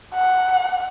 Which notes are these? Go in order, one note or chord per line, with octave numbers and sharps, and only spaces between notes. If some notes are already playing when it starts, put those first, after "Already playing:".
F#5